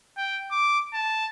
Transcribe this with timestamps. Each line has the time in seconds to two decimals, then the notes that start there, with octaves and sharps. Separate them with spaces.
0.18 G5
0.51 D6
0.94 A5